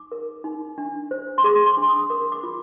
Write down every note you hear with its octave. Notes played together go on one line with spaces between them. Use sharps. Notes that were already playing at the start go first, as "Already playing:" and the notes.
Already playing: D#4 D6
A#4
D#4
D4
C5
C6
G#4 D6
C6
D4
D#6
A#4 D6
D6
F4